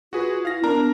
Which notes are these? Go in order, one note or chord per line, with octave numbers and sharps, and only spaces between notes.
F4 F#4 G#4 B4
E4 F5 A#6
B3 D4 A#4 A#5